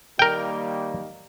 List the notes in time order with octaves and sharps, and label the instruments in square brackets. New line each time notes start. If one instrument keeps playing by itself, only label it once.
[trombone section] D#3 G3 A#3 [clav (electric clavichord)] A#4 G5